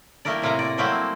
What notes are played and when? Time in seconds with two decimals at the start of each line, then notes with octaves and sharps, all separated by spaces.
0.25 G3 A3 A#3 E4 A#4 D5
0.42 A2 C3 A#3 A#5
0.59 D5
0.78 F#3 G3 A3 A#3 C4 E4